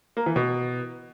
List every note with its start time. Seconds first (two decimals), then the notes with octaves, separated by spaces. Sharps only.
0.17 A#3
0.26 E3
0.36 B2